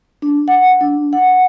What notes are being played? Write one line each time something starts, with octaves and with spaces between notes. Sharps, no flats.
D4
F#5
D4
F#5